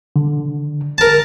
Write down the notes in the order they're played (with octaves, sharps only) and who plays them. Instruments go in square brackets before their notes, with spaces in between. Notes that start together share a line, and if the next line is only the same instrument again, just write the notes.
[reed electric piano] D3
[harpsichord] A#4 A5